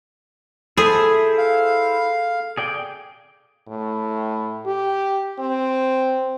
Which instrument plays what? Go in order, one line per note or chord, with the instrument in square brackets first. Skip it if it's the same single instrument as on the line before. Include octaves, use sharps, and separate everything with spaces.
[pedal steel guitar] E4 C5 E5 [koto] G#4 [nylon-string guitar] A4
[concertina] F5
[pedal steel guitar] G#4 D5 G5
[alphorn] A2
G4
C4